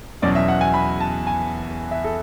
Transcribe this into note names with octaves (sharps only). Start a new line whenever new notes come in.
E2 B2 F#3 C#4 D5
E5
F#5
G#5
B5
A5
G#5
E5
A4